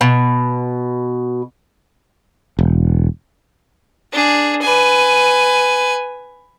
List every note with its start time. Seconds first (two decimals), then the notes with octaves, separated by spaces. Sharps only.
0.01 B2
2.59 E1
4.12 D4 G#4
4.62 B4 G#5